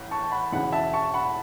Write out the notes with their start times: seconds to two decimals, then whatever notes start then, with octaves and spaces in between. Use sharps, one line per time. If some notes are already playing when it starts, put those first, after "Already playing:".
Already playing: A1 A2
0.11 A5 C#6
0.24 A5
0.31 F#5 B5
0.52 E1 E2 C#3 E3 F#5 B5
0.72 E5 A5
0.94 A5 C#6
1.14 F#5 B5